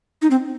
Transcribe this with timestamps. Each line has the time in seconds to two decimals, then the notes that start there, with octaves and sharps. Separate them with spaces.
0.22 D#4
0.31 C4